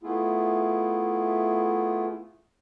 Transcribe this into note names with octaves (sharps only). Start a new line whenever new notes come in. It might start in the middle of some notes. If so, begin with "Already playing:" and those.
A3 B3 E4 F4 G#4